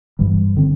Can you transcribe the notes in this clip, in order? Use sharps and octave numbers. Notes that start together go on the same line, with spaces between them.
G1 G2 E3 G3
D3 C4